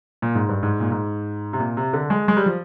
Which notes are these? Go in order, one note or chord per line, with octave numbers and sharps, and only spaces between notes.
A#2
G#2
G2
G#2
A#2
G#2
C3
A#2
C3
D3
G#3
G#3
G3
F3